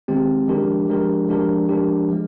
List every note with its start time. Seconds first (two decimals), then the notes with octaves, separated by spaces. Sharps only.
0.08 D#3 G#3 C4 G4
0.48 F3 G#3 D4 G4 A#4
0.88 F3 G#3 D4 G4 A#4
1.29 F3 G#3 D4 G4 A#4
1.69 F3 G#3 D4 G4 A#4
2.09 F3 G#3